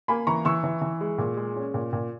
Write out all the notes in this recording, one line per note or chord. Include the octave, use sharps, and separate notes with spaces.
A#3 G#5 B5
E3 A#5 C#6
E3 C#6 E6
E3
E3
G#3
A#2
G#3
C#4
A#2
A#2